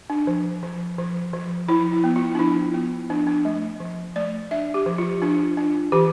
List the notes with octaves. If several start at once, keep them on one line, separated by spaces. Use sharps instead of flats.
D4
F3
F3
F3
F3
F3 E4
E4
B3
F4
D4
F3 E4
B3
F3 D4
D4
A3
F3
A3 D5
D4 E5
G4
F3
F4
D4 F4
D4
E3 G4